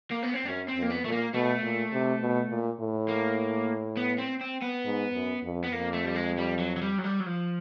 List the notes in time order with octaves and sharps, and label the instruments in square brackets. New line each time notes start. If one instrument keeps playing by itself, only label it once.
[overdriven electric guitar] A#3
B3
C4
[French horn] F#2 [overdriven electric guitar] C#4
[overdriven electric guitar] C4
[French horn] F2
[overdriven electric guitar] A#3
B3
[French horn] A#2 [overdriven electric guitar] A3
[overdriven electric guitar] A#3
[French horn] B2 [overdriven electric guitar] A3
[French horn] A#2
C3
B2
A#2
A2
[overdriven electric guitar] A#3
B3
C4
C4
B3
[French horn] G#2
F#2
F2
[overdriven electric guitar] B3
[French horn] F2 [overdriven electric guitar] A#3
[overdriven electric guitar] A3
G3
G#3
G3
F#3
F#3
G3
F#3
G3
F#3
F3